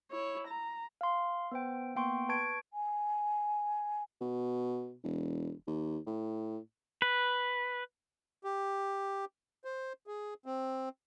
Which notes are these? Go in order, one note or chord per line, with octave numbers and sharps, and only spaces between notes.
E4 C#5
A#5
F5 C6
B3 C5 G5
A#3 B3 G5 C6 C#6
B4 A5 C#6 G#6 D7
G#5
B2
E1
D#2
A2
B4
G4
C5
G#4
C4